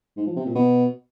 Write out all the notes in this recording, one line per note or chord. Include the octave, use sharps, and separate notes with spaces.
G#2
F3
C3
A#2
B2